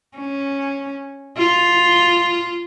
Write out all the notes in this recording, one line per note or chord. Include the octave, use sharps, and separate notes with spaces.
C#4
F4